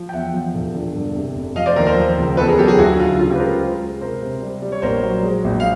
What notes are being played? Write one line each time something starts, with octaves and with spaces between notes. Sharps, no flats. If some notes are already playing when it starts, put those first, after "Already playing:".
Already playing: F3
G5
E2 E5 F#5
F3
E1
D3
G2
C3
F1
F3 D#5 F5
C5 D5
D#2 A#4 C5
A#4 C5
F3
C#2
E2 A4 B4
G#4 A#4
F#3 G4 A4
F#4 G#4
D2 E4 F#4
D2 F4
C#3 F4
F4 G4
B4
G#3 A#4 C5
G#3
G#3
C3 A#4 C5
C3
G3
G3
C#5
A#1 A#4 C5
F#3
G#3
A#1
F5